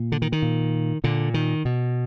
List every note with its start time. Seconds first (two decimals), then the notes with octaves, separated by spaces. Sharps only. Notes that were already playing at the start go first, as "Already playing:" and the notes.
Already playing: A#2
0.12 D3
0.22 D#3
0.32 D#3
0.42 A#2
1.04 A#2 D3
1.34 D#3
1.65 B2